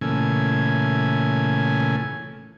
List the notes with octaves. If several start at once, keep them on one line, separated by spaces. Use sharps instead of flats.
A#2 C#3 E3 A3 G#5